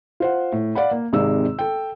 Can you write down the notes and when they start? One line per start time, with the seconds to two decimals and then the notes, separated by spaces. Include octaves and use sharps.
0.20 F4 C5 F#5
0.52 A2
0.75 D5 F5 F#5 B5
0.91 A#3
1.13 G#1 C3 D#3 G#3 D5 E6
1.59 A4 G5